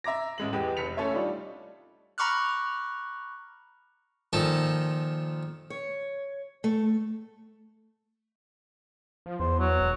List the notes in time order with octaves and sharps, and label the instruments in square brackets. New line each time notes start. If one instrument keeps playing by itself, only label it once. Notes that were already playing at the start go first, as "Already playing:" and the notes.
[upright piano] E5 A#5 D6 A#6
A1 G#3 F#7
E2 G#3 B3 G4
F1 B6 C#7 F7
A3 C#4 A4 C#5 E5
G3 D4 D#4 F4
[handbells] A#5 B5 C#6 D6 F6 F#6
[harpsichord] A#2 D#3 F3 A4
[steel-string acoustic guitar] C#5
A3
[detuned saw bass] F3
[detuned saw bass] E2 [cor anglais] C5
[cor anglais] F#3
[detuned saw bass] E1